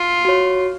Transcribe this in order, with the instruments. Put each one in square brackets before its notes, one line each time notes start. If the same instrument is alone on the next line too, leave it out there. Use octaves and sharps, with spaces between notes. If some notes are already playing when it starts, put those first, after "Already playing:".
Already playing: [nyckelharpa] F4
[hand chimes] F#4 C#5